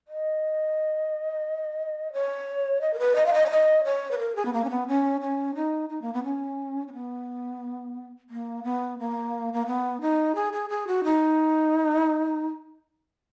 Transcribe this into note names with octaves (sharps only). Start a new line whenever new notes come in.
D#5
C#5
D#5
A#4
B4
D#5
F5
D#5
C#5
D#5
C#5
B4
A#4
G#4
B3
A#3
C#4
B3
C#4
C#4
D#4
D#4
A#3
B3
C#4
C#4
B3
A#3
B3
A#3
A#3
B3
D#4
G#4
G#4
G#4
F#4
D#4